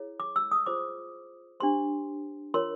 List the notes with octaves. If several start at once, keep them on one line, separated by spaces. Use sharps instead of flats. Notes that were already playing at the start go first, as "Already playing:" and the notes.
Already playing: E4 G#4 C#5
D6
E6
D#6
F4 G#4 C5 D6
D4 G4 C5 C6
F4 A#4 C#5 C6